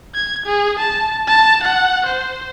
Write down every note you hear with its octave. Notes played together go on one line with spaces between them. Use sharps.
G#6
G#4
A5
A5
F#5
C5